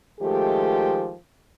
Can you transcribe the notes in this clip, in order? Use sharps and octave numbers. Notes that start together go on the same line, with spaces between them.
D#3 F3 G#3 A3 G4